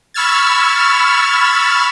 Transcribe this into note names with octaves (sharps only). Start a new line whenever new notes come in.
B5 C#6 E6 F6 G#6 A6